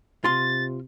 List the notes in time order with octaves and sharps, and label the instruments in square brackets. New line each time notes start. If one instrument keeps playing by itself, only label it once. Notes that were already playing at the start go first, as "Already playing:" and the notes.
[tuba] C3 [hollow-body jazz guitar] F4 C6 [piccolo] A6